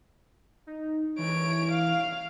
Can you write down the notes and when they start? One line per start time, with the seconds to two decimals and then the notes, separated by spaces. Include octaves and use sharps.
0.67 D#4
1.18 E3 C#5 D7
1.71 F5